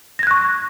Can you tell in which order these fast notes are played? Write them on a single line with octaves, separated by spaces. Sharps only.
A#6 G#6 F#6 C#6